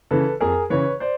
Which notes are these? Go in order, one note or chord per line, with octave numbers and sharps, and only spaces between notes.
C#3 E3 A4 B4
F2 G#4 A#4
C#3 E3 B4 C#5
C5 D5